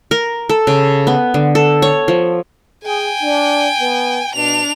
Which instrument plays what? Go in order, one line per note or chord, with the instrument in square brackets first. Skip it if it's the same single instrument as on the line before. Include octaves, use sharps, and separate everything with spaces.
[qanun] A#4
A4
C#3
B3
D3
A4
C#5
F3
[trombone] G#4 [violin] G5 G#5
[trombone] D4
B3
[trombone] B2 [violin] D4 F7